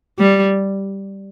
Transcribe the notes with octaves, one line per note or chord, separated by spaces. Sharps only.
G3